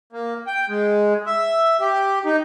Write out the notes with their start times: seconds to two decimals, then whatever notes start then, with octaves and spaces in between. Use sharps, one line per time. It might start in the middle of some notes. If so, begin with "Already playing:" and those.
0.13 A#3
0.47 G5
0.68 G#3
1.26 E5
1.80 G4
2.25 D#4